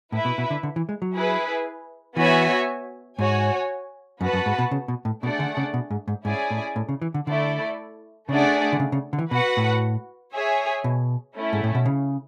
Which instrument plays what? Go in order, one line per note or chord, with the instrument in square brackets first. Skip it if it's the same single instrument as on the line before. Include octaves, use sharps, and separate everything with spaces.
[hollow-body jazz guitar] A2 [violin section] E4 B4 E5
[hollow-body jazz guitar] B2
B2
D3
D3
E3
G#3
F#3
[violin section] E4 G#4 B4
[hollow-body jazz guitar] E3 [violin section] B3 F#4 C#5 E5 G#5
[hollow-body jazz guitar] G#2 [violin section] F#4 C#5 G#5
[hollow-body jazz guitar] F#2 [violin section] B3 F#4 B4 F#5 A5
[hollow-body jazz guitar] F#2
G#2
B2
C#3
B2
A2
[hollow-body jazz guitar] B2 [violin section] A3 D4 G#4 D5 F#5
[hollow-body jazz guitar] D3
C#3
B2
G#2
G#2
[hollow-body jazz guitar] G#2 [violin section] C#4 E4 G#4 D5 G#5
[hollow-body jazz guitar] A2
A2
C#3
E3
D3
[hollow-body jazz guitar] D3 [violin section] A3 E4 A4 D5
[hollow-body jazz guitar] C#3 [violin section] A3 D4 G#4 D5 F#5
[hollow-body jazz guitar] D3
C#3
C#3
D3
E3
[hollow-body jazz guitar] B2 [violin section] F#4 B4 F#5
[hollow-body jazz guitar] A2
[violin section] G#4 C#5 E5 G#5
[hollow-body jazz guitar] B2
[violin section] A3 C#4 E4
[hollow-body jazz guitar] G#2
A2
B2
C#3